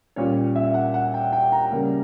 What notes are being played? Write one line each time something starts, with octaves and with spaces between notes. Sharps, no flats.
A#2 G3 C#4 C#5
E5
F#5
F#5
G5
G5
A#5
C#3 G3 A#3